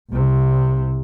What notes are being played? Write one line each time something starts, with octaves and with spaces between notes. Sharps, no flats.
C2 C3